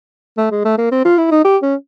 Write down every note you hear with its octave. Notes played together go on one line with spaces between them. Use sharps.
A3
G#3
A3
A#3
C4
F4
E4
D#4
G4
C#4